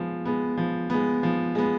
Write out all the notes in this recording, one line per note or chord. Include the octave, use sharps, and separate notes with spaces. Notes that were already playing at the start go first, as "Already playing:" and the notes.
Already playing: F3 G#3 B3
G#3 B3
F3
G#3 B3
F3
G#3 B3